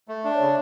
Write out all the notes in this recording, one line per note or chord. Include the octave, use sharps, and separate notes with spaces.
A3
D4 E5
C#5
C#3 D5